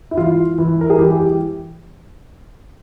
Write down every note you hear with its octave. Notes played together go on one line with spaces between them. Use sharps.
E4
E3 F4
E3
A#4
G#4
E3 G4
G4